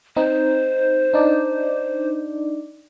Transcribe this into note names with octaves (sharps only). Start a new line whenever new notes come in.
C4 D#4 C5
D4 D#4 D5